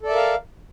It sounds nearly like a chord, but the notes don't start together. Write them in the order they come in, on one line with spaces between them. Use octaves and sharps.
A4 D5 E5 A#4 F5